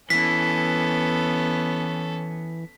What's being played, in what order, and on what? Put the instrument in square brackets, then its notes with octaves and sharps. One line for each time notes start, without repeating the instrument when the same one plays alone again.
[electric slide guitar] E3 [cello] B3 [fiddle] C#4 A4 [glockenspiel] B6